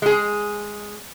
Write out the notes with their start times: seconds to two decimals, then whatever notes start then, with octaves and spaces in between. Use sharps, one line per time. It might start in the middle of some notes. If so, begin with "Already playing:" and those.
0.02 G#3 G#4